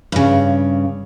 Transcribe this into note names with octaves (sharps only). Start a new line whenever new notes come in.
G2 C#3